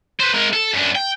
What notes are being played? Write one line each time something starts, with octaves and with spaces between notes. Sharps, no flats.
B4 C5
G#3 A#4
A4
F#2 D4
G5